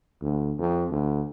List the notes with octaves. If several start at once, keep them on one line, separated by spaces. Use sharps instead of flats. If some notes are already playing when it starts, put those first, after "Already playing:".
D2
F2
D2